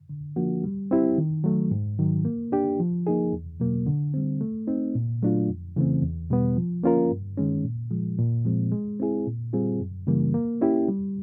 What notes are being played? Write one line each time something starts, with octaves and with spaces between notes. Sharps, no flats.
D3
F3 A#3 D4 F#4
G3
C4 E4 G4
D#3
F#3 A3
G#2
D#3 F#3
A#3
D4 G4
F3
A#3 D#4 G#4
E2
B2 F#3 A#3
D3
G3 C4
A3
C4 D#4
A#2
F#3 A3 D4 F4
F2
C#3 E3 A3 C4
E2
B2 G3 B3
F3
A#3 C#4 F4 A#4
G2
D#3 G#3 C#4
A#2
F3 G#3
A#2
F3 G#3 C4
G#3
C4 E4 G#4
A#2
G3 C4 F4 G#4
F#2
C#3 E3 G3 A#3
A#3
C#4 E4 G4
G3